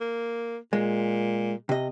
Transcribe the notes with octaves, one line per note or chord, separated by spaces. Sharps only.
A#3
A#2 G#3
C3 D#5